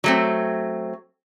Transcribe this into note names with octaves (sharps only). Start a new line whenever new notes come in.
F#3 A3 C4